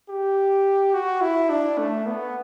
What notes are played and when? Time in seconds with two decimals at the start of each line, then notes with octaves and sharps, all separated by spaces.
0.09 G4
0.94 F#4
1.21 E4
1.50 D4
1.78 A3
2.06 B3